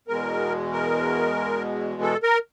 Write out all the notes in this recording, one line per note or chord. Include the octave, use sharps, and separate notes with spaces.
E2 B2 G#3 A#4
A#4
A4
A#4